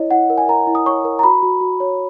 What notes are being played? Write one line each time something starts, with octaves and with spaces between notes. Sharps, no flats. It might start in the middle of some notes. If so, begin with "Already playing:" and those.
Already playing: E4 C#5 D#5
E4 F#5
A#4
G#5
A#4 A#5
E4
D#6
C#5 C#6
A#4
A#5
F#4 B5
F#4
F#4
C#5